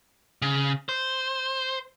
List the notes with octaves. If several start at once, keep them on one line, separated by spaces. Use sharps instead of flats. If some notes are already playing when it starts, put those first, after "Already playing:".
C#3
C5